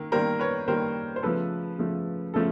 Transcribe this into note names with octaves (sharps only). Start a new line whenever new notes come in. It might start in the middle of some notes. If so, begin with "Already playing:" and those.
Already playing: D#3 A#3
D#3 G3 A#3 A#4 C5
B4 C#5
D#3 G3 A#3 A#4 C5
C5
C#3 F3 A3 A4 B4
C#3 F3 A3
C#3 F3 A3 A4